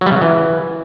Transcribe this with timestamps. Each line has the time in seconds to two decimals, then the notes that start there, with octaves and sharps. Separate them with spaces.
0.01 F#3
0.06 G3
0.11 C#3
0.16 F#3
0.21 E3